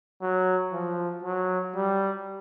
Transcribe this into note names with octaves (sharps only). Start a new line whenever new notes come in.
F#3
F3
F#3
G3